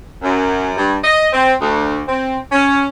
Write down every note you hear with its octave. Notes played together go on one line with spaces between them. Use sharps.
F#2
G2
D#5
C4
D2
C4
C#4